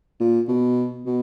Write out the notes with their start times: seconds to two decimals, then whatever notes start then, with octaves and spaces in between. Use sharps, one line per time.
0.20 A#2
0.48 B2
1.06 B2